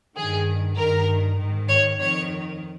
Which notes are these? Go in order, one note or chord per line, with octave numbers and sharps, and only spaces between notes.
G2 D#3 G#4
G2 D#3 A#4
G#2 D#3
C#5
F2 D#3 C#5